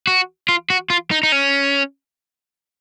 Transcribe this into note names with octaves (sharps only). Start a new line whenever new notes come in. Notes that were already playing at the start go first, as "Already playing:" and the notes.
F#4
F4
F#4
F4
D#4
D#4
C#4